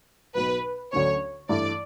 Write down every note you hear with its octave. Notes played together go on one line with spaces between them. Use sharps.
B1 B2 F#3 B4
D2 D3 F#3 C#4 C#5
G2 E3 A3 E4 D5